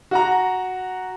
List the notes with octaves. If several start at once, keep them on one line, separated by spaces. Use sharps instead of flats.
F#4 F#5 A#5